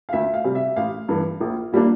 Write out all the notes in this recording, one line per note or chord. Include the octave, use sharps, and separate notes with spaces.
F5
D2 E5
F5
C3 G3
E5
A1 F5
G2 E3
A#1
A#2 G3 A#3 D4